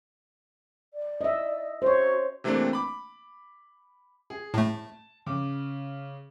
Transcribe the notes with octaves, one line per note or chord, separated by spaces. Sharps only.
D5
D#5 E5
F#4 C5 C#5
C3 E3 A3 A#3 C4 D4
B5 D6
G#4
A2 A3 A5
C#3 D6